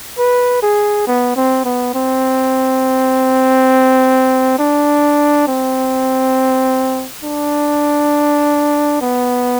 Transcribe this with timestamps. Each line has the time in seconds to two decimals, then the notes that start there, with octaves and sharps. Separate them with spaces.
0.18 B4
0.63 G#4
1.07 B3
1.36 C4
1.65 B3
1.94 C4
4.59 D4
5.47 C4
7.24 D4
9.01 B3